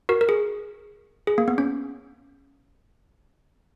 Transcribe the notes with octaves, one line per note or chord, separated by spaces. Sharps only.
F#4 A#4
A#4
G#4
G#4
A#3
B3
C#4